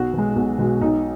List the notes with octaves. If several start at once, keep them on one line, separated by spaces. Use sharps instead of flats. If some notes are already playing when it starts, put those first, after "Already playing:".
Already playing: B1 F#4
B2 G#3
B1
B2 G#3
B1 D#4